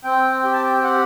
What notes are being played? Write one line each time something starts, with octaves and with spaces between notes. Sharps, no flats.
C4 G5
G4 G5
A5
G5
G4 F#5